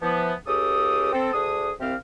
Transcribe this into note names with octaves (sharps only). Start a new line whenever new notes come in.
E3 F3 B3
C#2 C#3 G4 A4 D#6
C4 A4
D2 D4 G#4 D#6
C2 C3 C4 G4 F5 F6